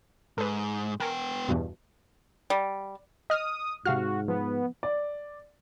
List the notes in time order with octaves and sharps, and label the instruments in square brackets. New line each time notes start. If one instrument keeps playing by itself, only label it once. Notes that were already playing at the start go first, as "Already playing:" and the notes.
[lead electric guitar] G#2 [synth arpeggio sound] A4 B4
[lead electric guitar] B3 G5 [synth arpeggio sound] A#4 G#5 C#6
[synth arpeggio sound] E2 G2 B2
[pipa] G3
[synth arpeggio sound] D#5 F6 [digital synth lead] D#6
[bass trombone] G#2 [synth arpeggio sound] C3 F5 F6 [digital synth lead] F#4
[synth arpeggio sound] F3 [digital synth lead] B3
[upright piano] D5